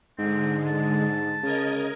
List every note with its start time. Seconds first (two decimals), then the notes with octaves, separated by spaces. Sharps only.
0.18 G#2 D3 G#3 C4
0.67 A5
1.43 C#3 A#4 D#5 G#6